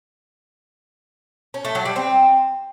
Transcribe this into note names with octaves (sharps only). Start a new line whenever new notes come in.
C#4
A3
F#3
G3
C4